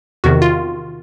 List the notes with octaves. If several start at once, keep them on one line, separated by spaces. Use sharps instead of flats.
E2 C3 D#3 F#4
F4